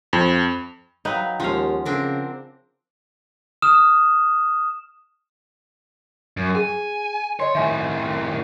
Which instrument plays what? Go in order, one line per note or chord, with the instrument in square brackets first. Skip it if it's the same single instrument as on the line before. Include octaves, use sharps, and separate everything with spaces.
[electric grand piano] F2
[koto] F#3 [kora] D#4 B4 [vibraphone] F5 G5 A#5
[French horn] D#2 [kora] F3 F5 [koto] G#3 C#4 [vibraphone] F#5
[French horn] C#3 [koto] C4 D4 A#4
[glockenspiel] D#6 F6 E7
[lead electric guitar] F#2
[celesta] G#4 [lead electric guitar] G#5
[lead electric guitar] C#5 [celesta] D#5 C6
[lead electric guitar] A2 D#3 [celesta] E5 G#5